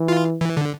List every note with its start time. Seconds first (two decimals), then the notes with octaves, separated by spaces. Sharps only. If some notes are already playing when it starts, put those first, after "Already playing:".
Already playing: E3
0.08 F4
0.41 E3
0.57 D3